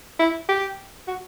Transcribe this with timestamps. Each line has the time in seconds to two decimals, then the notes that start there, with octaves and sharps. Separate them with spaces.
0.19 E4
0.48 G4
1.07 F#4